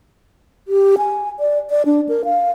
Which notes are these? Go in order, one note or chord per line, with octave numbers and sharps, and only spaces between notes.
G4
G#5
D5
D5
D4
A#4
F5